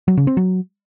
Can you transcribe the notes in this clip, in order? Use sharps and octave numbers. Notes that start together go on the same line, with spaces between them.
F#3
C#3
C4
F#3